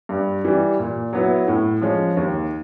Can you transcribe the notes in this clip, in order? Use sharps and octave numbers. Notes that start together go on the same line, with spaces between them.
G2
E3 G3
A#2
F#3 B3 E4
A2
F3 G#3 C#4
D#2